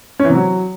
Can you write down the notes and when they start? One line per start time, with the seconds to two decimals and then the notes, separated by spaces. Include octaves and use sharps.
0.19 C#4
0.25 E3
0.30 C3
0.35 F#3